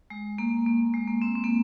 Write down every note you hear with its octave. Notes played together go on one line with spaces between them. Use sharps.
G#3
A#3
A#3
G#3
A#3
C4
C4
A#3